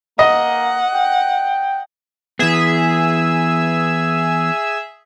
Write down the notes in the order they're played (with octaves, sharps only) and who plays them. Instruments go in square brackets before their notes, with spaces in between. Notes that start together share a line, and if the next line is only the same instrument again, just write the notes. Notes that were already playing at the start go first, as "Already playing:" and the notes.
[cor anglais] A#3 [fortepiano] D#5 [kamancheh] F#5
[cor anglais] G5
[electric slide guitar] E3 B3 [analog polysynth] G#4 E5